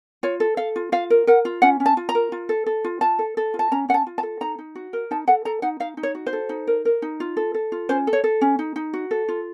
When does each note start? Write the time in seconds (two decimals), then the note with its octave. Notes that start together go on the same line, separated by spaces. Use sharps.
0.23 F4 C#5
0.40 A4
0.57 A4 F5
0.76 F4
0.92 F4 F5
1.10 A#4
1.27 A#4 F#5
1.45 F4
1.62 C#4 F#5
1.80 C#4
1.86 A5
1.97 F4
2.09 A#5
2.15 A#4
2.32 F4
2.49 A4
2.66 A4
2.85 F4
3.01 F4 A5
3.19 A4
3.37 A4
3.54 F4
3.59 A5
3.71 C#4 A#5
3.89 C#4 F#5
3.94 A5
4.07 F4
4.18 A5
4.23 A4
4.41 D#4 A#5
4.58 D#4
4.75 F#4
4.93 A#4
5.11 D#4 A5
5.27 A4 F#5
5.45 A4 A#5
5.62 D#4 F#5
5.80 D#4 F5
5.97 D#4
6.03 C#5
6.15 F#4
6.26 C5
6.33 A4
6.49 D#4
6.67 A#4
6.85 A#4
7.02 D#4
7.20 F4
7.37 A4
7.54 A4
7.72 F4
7.89 C#4 C5
8.07 A4
8.13 C#5
8.24 A4
8.41 C#4
8.59 D#4
8.76 D#4
8.93 F#4
9.11 A4
9.29 F4